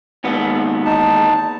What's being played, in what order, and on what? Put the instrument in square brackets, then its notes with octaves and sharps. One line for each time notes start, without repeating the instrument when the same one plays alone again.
[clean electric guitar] D#2 G#2 B3
[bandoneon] E2 D#4 A5